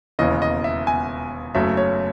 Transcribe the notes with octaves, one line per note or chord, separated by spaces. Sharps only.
E1 D#2 C#3 E3 D#5
D#5
E5
G#5
F#1 F#2 C#3 F#3 A3 E5
C#5